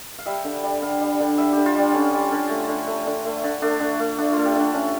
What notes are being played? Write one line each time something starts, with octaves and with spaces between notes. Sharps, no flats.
F5
G3 E5
D3
G3
D3 F5
G3
D3
G3 E5
D3 G4
F4
G3 D4
D3 C#4
G3
D3
A3
D3
A3
D3
A3
D3
A3 D4
D3
A3
D3 D4
A3 F4
G4
D3 D4
D3 C#4